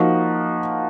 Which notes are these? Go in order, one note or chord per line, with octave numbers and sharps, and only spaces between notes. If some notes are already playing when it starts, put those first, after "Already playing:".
Already playing: F3 A#3 D#4 F#4